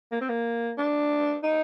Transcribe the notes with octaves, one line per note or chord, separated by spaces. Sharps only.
A#3
C4
A#3
D4
D#4